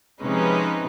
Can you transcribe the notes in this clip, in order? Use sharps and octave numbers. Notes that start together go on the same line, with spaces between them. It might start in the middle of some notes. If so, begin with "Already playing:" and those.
C3 F3 G#3 C#4 D#4 B4